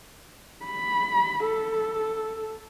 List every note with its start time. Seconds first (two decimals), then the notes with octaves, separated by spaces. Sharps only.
0.65 B5
1.46 A4